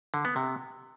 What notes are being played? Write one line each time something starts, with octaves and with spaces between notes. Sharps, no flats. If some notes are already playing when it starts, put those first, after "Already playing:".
D3
B3
C3